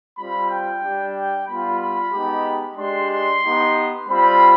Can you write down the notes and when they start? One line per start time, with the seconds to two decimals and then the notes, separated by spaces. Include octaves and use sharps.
0.18 G3 C4 F4 B5
0.50 G5
0.83 G3 D4 G4
1.15 G5
1.47 G3 B3 F4 B5
1.80 B5
2.12 G#3 B3 D#4 G4
2.77 G#3 D4 G4 C6
3.10 C6
3.42 B3 D#4 G4
4.07 G3 C4 F4 B5